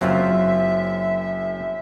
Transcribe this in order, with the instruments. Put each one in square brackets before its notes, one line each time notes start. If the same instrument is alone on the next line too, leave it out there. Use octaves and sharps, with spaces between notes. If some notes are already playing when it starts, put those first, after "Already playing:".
[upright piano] F#1 F#2 C5 [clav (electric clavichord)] F#3 C4 F4 [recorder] E5